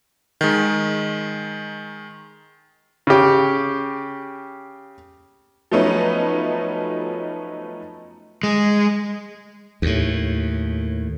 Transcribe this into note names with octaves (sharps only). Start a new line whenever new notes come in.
D#3 G#3
C#3 G4
F3 F#3 A3 B3 C#4 D#4
G#3
D#2 A2